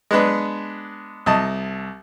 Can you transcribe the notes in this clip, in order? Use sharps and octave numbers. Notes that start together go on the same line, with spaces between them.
G#3 B3 D4 B4
C2 D#5 A5